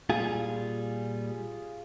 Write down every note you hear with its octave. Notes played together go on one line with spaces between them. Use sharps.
A#2 G3 F4 G#4